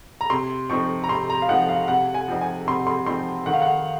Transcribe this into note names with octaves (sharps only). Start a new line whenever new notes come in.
A#5
C3 C6
F3 C4 D#4 C#6
A#5
C3 C6
A#5
F5
F3 C4 D#4 F#5
F5
C3 F#5
G#5
F3 C4 D#4
G#5
C3 C6
C6
F3 C4 D#4 C6
D#3 F#5
F5
F#5